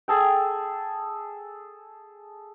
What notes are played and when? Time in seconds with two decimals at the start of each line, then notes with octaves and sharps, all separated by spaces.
0.08 G#4 A4 G5